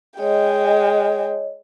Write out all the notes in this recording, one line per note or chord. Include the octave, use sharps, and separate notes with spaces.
G#3 C#5 D#5 G5